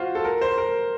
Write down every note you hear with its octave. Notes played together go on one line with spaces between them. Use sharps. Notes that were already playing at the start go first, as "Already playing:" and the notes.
Already playing: F4 F#4 C5
A4
A#4
C5
A#4